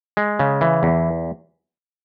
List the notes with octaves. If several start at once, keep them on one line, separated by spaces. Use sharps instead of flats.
G#3
C#3
E3
E2